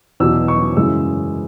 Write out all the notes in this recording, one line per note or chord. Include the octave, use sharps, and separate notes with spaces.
E2 B2 F#3 E6
C#6
F#2 C#3 E3 G#3 E6